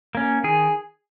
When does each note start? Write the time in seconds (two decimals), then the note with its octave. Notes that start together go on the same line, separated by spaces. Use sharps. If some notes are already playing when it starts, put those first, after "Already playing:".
0.15 A#3 C#4
0.44 D#3 G#4